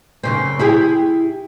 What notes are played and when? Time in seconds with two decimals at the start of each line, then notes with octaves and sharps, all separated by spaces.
0.23 F#2 C#3 C4
0.59 E4 G4 G#4